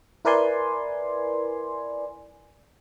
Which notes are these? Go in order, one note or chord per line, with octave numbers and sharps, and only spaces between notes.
E4 A#4 B4 D5 G#5 C6